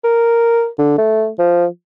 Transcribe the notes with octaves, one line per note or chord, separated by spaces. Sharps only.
A#4
D3
A3
F3